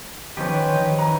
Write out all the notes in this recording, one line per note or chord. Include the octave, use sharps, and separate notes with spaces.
D#3 F3 C#4 G4 B4 C5
C#5 F#5 A5
D#3 D#4
E3 F#3 B4 A#5 D#7